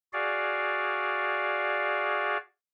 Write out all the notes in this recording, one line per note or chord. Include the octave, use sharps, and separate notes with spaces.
F#4 G#4 D5 F5